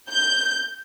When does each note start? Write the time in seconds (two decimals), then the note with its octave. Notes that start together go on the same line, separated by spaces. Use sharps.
0.10 G6